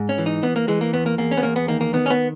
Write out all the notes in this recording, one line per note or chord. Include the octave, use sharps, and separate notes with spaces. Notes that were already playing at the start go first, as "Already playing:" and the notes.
Already playing: G#2
C#4
E3
D#4
E3 B3
A#3
E3 G#3
A#3
E2 B3
A#3
E2 A#3
C#4
B3
E2 A#3
B3
D#3 A#3
A#3
D#3 B3
C#4
B3